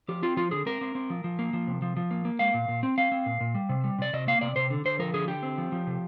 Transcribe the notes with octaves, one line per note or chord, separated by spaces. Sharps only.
F3 G4
C4 F4
F3 F4
D3 G#4
C4 A#4
C4
C4
F3
F3
A#3
F3
C3
F3
F3
A#3
A#3
G#3 F5
A#2
A#2
C4
C4 F5
C4
A#2
A#2
G3
C3
G3
C3 D5
C3 D#5
A#3 F5
C3 D5
C3 C5
D3
D3 C5
F3 A#4
D3 G#4
D3 G4
C4
F3
F3
C3